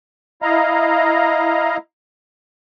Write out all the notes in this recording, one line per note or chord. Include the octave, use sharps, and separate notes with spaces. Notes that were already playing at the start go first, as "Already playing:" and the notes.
E4 D#5 F5 A#5